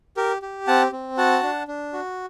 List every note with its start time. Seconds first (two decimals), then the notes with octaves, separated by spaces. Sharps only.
0.17 G4 A#4
0.42 G4
0.67 C4 F#5 A5
0.92 C4
1.17 F#4 F#5 A5
1.43 D4
1.68 D4
1.93 F#4